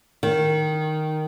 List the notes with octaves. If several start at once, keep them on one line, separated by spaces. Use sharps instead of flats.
D#3